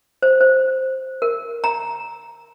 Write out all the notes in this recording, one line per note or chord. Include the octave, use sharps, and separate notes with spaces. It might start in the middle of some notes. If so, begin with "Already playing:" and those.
C5
C5
A#4
A#5